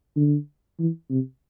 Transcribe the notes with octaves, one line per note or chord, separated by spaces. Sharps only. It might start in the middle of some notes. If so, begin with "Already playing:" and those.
D3
E3
C3